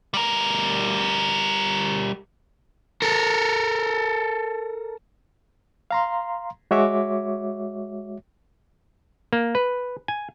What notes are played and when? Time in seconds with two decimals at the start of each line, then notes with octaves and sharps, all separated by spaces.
0.14 G3 A#4
3.02 A4 A#4
5.91 F5 A#5 C6
6.71 G#3 F#4 C#5 E5 D6
9.33 A#3
9.55 B4
10.08 G#5